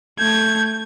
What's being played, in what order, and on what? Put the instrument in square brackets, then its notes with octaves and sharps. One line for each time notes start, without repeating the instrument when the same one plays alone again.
[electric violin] A3 G#6 [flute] G6